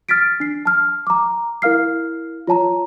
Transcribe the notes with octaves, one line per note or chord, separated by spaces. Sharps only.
F6 A6 B6 D7
D4 C7
A5 F6
A#5 D6
E4 A#4 F5 F6 C7
F4 C#5 A5 A#5